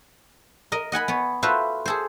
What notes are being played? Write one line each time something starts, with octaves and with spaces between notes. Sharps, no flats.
A#4 D#5
D#5 F#5 G#5 B5
B3 C#5
F4 F#4 A4 B4 C5 E5
G#4 A4 C5